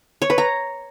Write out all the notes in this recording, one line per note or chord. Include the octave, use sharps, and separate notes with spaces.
C#5
B4
A#5